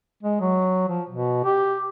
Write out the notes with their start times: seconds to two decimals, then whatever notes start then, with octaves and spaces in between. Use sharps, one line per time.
0.23 G#3
0.41 F#3
0.89 F3
1.09 B2
1.45 G4